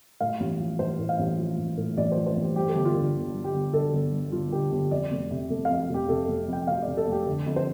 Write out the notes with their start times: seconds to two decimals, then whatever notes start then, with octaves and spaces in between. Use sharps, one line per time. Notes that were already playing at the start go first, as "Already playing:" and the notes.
0.21 A2 F5
0.40 A1
0.60 F3
0.79 A1 C5
0.99 A2
1.09 F5
1.19 A1
1.38 F3
1.58 A1
1.77 A2
1.97 A1 D5
2.12 F3 C5
2.26 C5
2.36 A1 G4
2.56 G2 G4
2.68 A4
2.75 G1 G4
2.85 F4
2.95 D3
3.14 G1
3.34 G2
3.44 G4
3.54 G1
3.73 D3 A4
3.93 G1
4.12 G2
4.32 G1 F4
4.52 D3 G4
4.71 G1 G4
4.91 F2 D5
5.11 F1
5.31 C3
5.50 F1 A4
5.65 F2 F5
5.89 F1 G4
6.09 C3 A4
6.23 A4
6.28 F1
6.48 F2 G5
6.67 F1 F5
6.82 C3 D5
6.97 A4
7.07 F1 G4
7.26 D3 A4
7.46 F2
7.56 C5